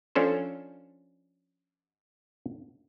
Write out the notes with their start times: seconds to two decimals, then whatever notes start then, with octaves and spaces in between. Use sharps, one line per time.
0.15 F3 C#4 D4 A4 C5